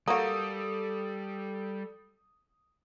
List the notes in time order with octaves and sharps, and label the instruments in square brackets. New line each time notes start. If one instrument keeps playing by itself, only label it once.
[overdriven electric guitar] G3 [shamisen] A#3 F#4 [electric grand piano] A4 D#6